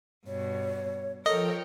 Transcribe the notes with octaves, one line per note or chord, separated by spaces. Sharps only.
G2 B2 C#5
F3 A4 A#4 C#5 D#5 G5